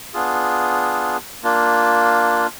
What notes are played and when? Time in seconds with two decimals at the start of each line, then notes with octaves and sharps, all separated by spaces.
0.14 B3 D4 F4 G#4
1.43 A#3 D4 F4